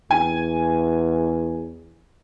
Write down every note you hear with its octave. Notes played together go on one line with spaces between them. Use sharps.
E2 G#5